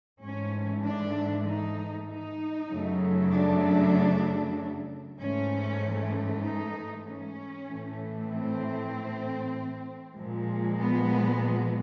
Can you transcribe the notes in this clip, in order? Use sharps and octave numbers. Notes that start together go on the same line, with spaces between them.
G#2 E3 A3 C#4
D4
D#4
D#4
F#2 C#3 F#3 A3
D4
G#2 E3 A3 C#4
D#4
C#4
A2 E3 A3
C4
A#2 F3 G#3
B3